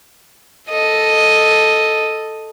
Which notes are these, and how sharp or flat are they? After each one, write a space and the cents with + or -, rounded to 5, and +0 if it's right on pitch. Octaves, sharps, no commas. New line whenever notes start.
A4 +0 D#5 +0